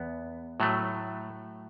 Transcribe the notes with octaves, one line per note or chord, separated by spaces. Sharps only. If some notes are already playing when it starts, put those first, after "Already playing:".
Already playing: E2 B3
A2 F#3 A3